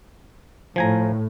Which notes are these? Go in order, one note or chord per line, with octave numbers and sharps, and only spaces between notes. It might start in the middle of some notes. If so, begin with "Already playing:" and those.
A2 F3 G#5 A#5